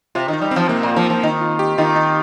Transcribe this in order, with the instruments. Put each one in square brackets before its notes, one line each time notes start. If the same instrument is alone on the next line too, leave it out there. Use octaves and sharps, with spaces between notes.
[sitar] C3 [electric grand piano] F4
[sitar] D#3
[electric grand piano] D#4
[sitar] G3
[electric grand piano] C4
[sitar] F3
[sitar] C3 [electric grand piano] A#3
[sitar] A#2
[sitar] F3 [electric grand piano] A#3
[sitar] F3
[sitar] D#3 [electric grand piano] D#4
[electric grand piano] F4
G4
[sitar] D#3 [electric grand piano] F4
[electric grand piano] D#4